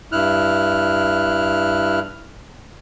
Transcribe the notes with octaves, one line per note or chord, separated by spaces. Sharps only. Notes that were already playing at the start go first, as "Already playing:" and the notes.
G2 E4 F6 F#6